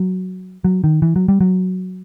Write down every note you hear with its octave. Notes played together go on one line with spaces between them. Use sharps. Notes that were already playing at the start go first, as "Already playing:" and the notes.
Already playing: F#3
F#3
D#3
E3
F#3
G3
F#3